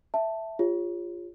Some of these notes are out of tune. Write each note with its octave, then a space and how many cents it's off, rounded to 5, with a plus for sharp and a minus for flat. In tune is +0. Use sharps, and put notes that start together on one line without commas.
E5 +0 A5 +5
F4 +0 G#4 -45 C#5 +0